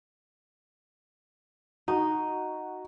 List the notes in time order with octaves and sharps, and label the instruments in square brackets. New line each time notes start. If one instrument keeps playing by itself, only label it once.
[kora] D#4 [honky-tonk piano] F#4